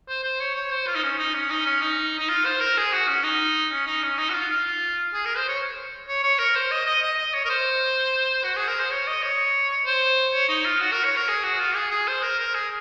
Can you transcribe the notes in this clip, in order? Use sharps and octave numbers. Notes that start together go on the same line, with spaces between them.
C5
C5
C#5
C#5
C5
F4
D#4
C#4
D#4
C#4
D#4
C#4
D#4
D#4
F4
C5
A#4
G#4
F#4
C#4
D#4
C#4
D#4
C#4
D#4
F#4
F4
F4
G#4
A#4
C5
C#5
C#5
C#5
A#4
C5
D#5
D#5
D#5
D#5
C#5
A#4
C5
F#4
G#4
A#4
C5
C#5
D#5
C#5
C5
C#5
D#4
F4
F#4
A#4
C#5
A#4
G#4
F#4
F4
G#4
G#4
C5
A#4
A#4
G#4